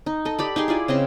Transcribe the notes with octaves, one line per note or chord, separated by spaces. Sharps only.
D#4
A4 D#5
G4 D5 B5
D#4 G4 G#4 C6
E4 F4 D5 G#5
C#3 C4 D#5 C6